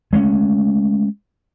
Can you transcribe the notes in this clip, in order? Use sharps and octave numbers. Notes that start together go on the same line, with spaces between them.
G#3 A3 C4 C#4